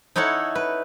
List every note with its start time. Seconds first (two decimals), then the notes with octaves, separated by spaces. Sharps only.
0.16 D#4 E4 A4 C#5 F#5
0.55 B4